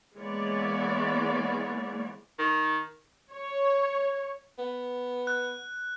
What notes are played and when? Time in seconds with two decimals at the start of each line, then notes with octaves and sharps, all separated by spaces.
0.17 E3 G#3 A#3 B3 C#5 D5
2.39 D#3
3.32 C#5
4.58 B3
5.27 F#6